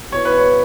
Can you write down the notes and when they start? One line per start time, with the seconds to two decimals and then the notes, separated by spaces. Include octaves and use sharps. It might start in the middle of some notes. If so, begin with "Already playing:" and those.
0.12 B2 B3 E4 C#5
0.25 B4
0.38 C#5